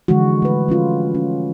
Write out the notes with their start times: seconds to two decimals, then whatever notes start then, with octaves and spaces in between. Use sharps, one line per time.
0.08 D3 E3 F3 G#3 F#4
0.42 A3 B4
0.68 F3 C#4 F4
1.15 C#4